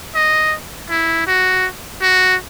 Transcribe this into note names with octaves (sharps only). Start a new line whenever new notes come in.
D#5
E4
F#4
F#4